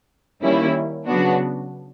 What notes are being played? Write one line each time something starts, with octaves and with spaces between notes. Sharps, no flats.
D#3 G3 A#3 C#4 E4
C#3 F#3 B3 D4 F#4